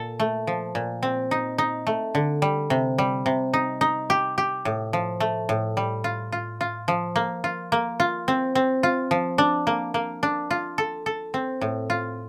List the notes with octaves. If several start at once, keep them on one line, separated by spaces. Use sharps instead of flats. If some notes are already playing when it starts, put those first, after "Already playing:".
Already playing: A#2 A4
A3
F3
A#2
C4
D#4
D#4
A3
D3
G3
C3
G3
C3
D#4
D#4
G4
G4
A2
F3
A3
A2
G3
F4
F4
F4
F3
A#3
F4
A#3
F4
C4
C4
F4
F3
D4
A#3
A#3
D4
F4
A4
A4
C4
A2
F4